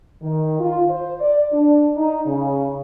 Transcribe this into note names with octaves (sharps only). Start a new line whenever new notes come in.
D#3
F4
C5
D5
D4
D#4
C#3